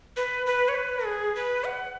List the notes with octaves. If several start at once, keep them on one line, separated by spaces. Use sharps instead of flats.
B4
B4
C#5
B4
G#4
B4
F#5